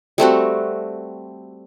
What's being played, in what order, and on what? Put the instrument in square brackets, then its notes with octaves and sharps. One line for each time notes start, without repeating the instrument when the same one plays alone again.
[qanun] G3 A3 C4 F#4